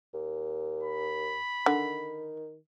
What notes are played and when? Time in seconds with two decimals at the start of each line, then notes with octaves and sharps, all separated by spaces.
0.14 D#2
0.83 B5
1.66 D3 D#3